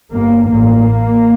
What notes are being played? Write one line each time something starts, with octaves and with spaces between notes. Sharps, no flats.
G1 G2 A#3
A1 A#3